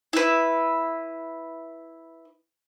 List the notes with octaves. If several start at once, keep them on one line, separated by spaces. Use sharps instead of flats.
E4 B4